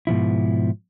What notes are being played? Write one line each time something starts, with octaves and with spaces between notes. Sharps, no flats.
G#2 B2 F3 E4